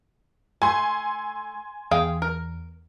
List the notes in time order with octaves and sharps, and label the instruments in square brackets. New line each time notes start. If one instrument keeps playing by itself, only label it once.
[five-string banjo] A3 [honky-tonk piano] G#5 C6
[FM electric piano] E2 [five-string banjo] G#4 F5 G5
[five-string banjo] A#4